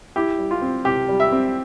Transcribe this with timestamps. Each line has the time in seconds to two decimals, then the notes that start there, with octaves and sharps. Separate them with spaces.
0.16 E4 G4
0.39 G3
0.51 F4
0.62 C4
0.85 C3 G4
1.08 G3
1.20 E5
1.32 C4